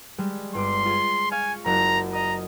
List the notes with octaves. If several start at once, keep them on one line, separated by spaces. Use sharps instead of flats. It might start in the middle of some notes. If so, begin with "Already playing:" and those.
G3 G#3
G1 C6 D6
F4 G#4
F5 G#5 C#6
F#1 F#2 F#4 A#5
D#5 A#5 D#6